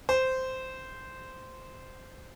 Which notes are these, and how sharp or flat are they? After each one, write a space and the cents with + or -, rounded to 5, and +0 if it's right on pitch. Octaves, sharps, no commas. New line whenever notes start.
C5 -10